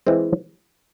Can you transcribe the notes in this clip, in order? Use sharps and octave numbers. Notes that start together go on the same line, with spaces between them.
E3 G#3 C4